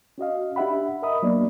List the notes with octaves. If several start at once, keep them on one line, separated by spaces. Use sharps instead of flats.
C#4 F#4 D#5 F5
D4 G4 E5 F#5 B5
A#4 D#5 E5 B5 D#6
F#3 A#3 B3 D4 D5